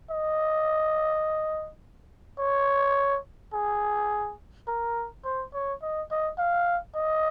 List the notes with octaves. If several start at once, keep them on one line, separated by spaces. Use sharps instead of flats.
D#5
C#5
G#4
A#4
C5
C#5
D#5
D#5
F5
D#5